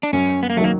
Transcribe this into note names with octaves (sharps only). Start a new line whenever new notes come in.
D4
F#2 C#4
B3
A#3
D#3 F#3 A3 A#3